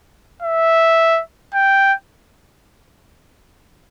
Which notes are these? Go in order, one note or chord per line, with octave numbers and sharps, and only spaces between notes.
E5
G5